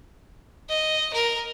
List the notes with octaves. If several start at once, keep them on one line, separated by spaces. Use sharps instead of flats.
D#5
A#4